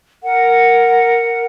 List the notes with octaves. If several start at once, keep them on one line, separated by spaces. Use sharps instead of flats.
A#4 F#5